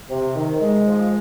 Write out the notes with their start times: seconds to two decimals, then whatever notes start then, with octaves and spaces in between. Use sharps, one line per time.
0.10 C3
0.35 D#3
0.61 G#3
0.87 F3